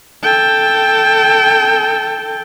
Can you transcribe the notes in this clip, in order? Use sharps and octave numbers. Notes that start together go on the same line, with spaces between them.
A4 G5